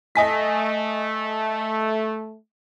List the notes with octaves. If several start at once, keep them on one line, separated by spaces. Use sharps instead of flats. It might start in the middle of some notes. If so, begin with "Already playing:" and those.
A3 D#5 G#5 B6